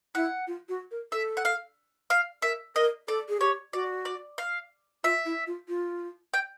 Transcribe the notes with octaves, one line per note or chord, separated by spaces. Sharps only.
E4 F#5
F4
F#4
A#4
A4 E5
F#5
F5
F5
A#4 E5
A#4 D#5
A4 D5
G#4
G4 C#5
F#4 D5
D5
F5
F4 E5
E4
F4
F4
G5